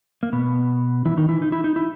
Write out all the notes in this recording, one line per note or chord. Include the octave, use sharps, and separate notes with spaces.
A#3
B2 B3
E3 E4
D#3 D#4
E3 E4
D#4
E4
D#4
E4